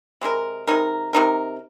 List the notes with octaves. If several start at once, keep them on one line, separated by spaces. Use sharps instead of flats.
C3 G#3 D#4 A#4
C3 G#3 D#4 A#4
C3 G#3 D#4 A#4